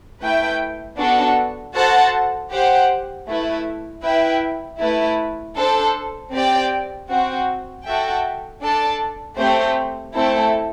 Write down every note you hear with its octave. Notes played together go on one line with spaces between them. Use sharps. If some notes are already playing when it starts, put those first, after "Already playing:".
A3 E4 B4 E5 G5
B3 D4 F#4 A4
F#4 A4 C5 F#5 A5
G4 C5 F#5
A3 E4 B4
E4 B4 E5 G5
A3 E4 B4
D4 A4 C5
C4 G4 D5 G5
C4 F#4 C5
F#4 A4 E5 G5
D4 A4 D5 A5
A3 C4 G4 C5
A3 C4 E4 A4